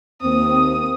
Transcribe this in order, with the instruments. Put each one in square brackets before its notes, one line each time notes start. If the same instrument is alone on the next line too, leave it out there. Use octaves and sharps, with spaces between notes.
[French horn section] D#2 A#3 C4 [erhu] D#6